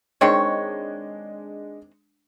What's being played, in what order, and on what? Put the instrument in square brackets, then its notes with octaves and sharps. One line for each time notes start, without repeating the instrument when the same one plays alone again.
[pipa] D#3 C4 C#5 [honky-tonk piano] G#3 D4